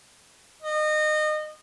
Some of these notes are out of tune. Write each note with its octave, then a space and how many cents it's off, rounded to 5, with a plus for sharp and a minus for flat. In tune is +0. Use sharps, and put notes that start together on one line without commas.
D#5 -25